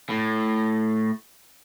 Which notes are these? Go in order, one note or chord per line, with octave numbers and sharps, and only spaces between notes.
A2